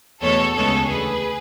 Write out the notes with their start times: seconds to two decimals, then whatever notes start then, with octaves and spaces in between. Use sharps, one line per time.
0.22 E2 B2 A3 A4 C#5
0.56 D2 C#3 G#3 B3 A4 C#5
0.89 E2 D3 A3 G#4 B4